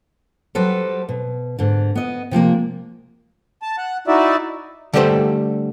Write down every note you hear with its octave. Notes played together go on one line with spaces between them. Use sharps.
F#3 G3 A4 B4 C5
B2
G#2 D3
B3 D#5
C3 F3 G#3 A#3
A5
F#5
D#4 E4 F#4 D5 E5
D3 G3 A3 G4 A4 C5